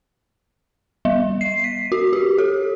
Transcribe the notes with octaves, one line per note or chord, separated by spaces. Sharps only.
G3
C7
B6
F#4
G4
A4